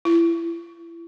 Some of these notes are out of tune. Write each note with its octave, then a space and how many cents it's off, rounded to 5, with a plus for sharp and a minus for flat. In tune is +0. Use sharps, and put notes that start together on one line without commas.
E4 +30